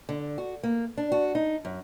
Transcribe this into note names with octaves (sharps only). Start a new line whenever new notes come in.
D3
F#4
A#3
D4
F#4
D#4
F#2